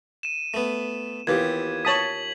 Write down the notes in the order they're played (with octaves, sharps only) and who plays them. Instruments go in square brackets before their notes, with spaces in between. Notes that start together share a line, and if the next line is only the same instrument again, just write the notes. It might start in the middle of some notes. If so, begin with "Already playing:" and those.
[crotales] D#7 E7
[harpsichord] A3 B3
[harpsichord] D#2 F4 [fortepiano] E3 B3 G4 [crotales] G#6
[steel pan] C#5 A5 D#6 [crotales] B6 F#7